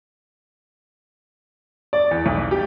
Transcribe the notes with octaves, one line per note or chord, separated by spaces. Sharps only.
D5
E2
B1
G4